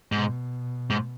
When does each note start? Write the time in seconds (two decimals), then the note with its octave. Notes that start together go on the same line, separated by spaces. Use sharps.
0.12 G#2 B2
0.90 G#2